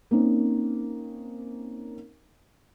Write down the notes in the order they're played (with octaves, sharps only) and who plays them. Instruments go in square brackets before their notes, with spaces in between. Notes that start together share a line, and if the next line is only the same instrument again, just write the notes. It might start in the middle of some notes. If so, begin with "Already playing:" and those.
[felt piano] A#3 C4 C#4 D#4 A#4